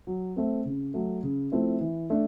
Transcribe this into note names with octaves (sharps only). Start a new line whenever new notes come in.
F#3
A3 C4
C#3
F#3 A3
C#3
F3 A3 C4 E4
E3
A3 D4